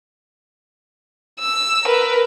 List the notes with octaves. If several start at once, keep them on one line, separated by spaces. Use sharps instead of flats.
E6
A#4 B4